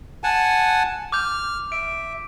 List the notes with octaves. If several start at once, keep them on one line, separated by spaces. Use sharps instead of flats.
F#5 G#5 A5
D6 F6 G6
E5 D7